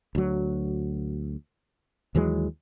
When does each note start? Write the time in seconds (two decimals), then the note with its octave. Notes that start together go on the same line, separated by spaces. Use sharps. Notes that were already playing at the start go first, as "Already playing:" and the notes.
0.15 D2 F#3
2.15 D#2 E3 F#3 G#3